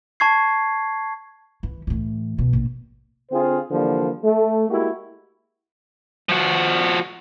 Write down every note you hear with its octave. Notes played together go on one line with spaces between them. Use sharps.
A5 C#6 G#6 C7
E3
A2 E3
B2
A#1 C4
D3 C4 F4 G#4 C5
D3 E3 F3 G3 A#3
A3
G#3 A#3 E4 F#4 G4
F3 F#4